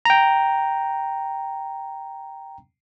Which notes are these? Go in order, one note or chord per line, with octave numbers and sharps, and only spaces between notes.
G5 A#5